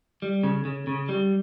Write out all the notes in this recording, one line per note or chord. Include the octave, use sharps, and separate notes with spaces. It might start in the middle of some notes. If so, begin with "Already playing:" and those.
G3
C#3
C#3
C#3
G3